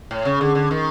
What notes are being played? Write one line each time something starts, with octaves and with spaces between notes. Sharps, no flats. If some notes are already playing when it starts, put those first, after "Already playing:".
A2
C#3
D3
D3
D#3